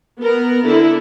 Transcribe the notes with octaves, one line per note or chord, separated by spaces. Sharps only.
B3 A#4
D3 E4